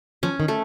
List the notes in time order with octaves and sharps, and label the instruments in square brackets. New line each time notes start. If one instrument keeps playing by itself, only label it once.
[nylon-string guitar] F3 [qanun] C#4
[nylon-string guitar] D#3
[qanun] A3